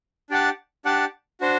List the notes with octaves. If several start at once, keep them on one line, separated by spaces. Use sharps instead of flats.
D4 G4 D5 F#5 A5
D4 G4 D5 F#5 A5
D4 F#4 C5